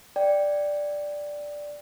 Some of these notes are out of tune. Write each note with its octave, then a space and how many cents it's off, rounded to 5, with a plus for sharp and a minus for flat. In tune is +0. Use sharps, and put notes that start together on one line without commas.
D5 +0 G5 +0